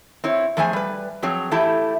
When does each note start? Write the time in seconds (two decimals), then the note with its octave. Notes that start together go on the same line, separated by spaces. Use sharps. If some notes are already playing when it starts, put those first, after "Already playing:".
0.24 C4 E4 C#5
0.57 E2 F3 A3 G#4 C5 G#5
0.73 G3 B4
1.22 F3 F#3 C4 G#4 C#5
1.51 E3 A3 E4 G4 A5